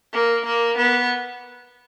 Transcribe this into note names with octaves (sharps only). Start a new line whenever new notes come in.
A#3
A#3
B3